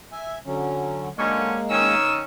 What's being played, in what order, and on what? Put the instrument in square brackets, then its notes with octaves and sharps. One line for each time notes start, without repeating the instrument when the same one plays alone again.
[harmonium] E5 G#5
D3 F#3 C#4
[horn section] D3 F#3 C#4 [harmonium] G#3 A#3
[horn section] D#3 C#4 [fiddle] E6